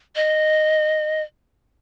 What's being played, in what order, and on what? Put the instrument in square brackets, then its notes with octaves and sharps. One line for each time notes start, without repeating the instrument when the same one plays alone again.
[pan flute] D#5